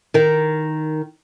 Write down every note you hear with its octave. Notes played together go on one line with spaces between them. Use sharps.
D#3 A#4